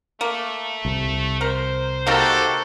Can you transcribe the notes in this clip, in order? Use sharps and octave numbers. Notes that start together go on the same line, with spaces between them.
A3 A#3
C2
A#4 C5
D#3 A#3 F#4 G4 A4 A#4